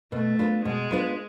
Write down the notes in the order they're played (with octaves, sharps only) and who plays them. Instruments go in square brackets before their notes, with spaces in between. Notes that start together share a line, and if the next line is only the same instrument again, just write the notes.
[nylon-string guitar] B2 [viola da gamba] A3
[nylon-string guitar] B3 D4 F4 B4
[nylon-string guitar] B2 [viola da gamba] G#3
[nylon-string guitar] B3 D4 F4 B4